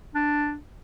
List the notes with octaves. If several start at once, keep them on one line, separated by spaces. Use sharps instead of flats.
D4